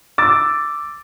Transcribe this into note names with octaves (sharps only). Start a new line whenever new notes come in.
D6 E6 A6